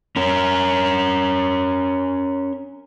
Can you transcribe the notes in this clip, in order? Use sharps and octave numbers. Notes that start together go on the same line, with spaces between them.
C#4 A#4